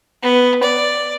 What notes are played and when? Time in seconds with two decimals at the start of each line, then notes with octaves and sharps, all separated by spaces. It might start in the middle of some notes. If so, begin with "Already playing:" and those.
0.23 B3
0.63 D5